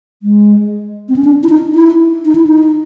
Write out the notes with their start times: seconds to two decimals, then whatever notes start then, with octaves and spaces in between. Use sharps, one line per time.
0.23 G#3
1.09 C4
1.16 C#4
1.24 D4
1.43 E4
1.49 D#4
1.75 E4
2.25 D#4
2.35 E4
2.47 D#4